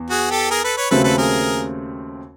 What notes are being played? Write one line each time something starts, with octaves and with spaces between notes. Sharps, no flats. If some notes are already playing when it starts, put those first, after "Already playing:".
Already playing: E2
F#4 G#4
G4 A4
G#4 A#4
A4 B4
B4 C#5
D#2 C#3 F#3 A3 C4 A4 B4
A4 B4
G#4 A#4